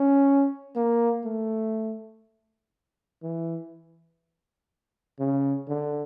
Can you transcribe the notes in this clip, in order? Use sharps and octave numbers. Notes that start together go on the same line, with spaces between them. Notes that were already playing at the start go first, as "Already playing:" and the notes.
Already playing: C#4
A#3
A3
E3
C#3
D3